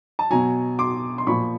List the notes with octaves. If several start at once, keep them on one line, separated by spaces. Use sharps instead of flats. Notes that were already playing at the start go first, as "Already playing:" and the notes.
A5
B2 F#3 G#5 A#5
C6 D6
C6
A#2 F3 B5 C#6